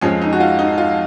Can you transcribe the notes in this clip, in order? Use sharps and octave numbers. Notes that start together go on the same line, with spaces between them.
F2 F3 G#3 C#4
D#4
F#4
F4
D#4
F4